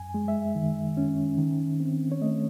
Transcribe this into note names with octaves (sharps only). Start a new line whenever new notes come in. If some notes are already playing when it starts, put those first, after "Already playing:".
Already playing: F#2 G#5
G#3
E5
D#3
C#4
D#3
C4
C#5
A3 D#5